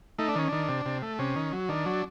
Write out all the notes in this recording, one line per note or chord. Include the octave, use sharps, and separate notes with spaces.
A3 D#4
D4
D#3 C#4
D#3 D4
C3
C3
A3
C3 C#4
D#3
F#3
D#3 D4
F#3